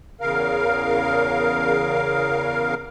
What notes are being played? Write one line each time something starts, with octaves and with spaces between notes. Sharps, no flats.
E2 C#3 A#4 F5